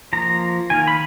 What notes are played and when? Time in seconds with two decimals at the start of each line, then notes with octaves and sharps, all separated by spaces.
0.13 F3 A#3 A#5
0.70 D#3 A#3 G#5
0.88 B5